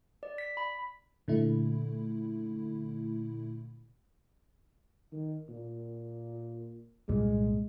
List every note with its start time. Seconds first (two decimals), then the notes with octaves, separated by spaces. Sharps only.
0.23 D5
0.38 B6
0.57 B5
1.28 A#2 D3 A3 E4
5.12 D#3
5.49 A#2
7.09 C2 G2 A#2 G#3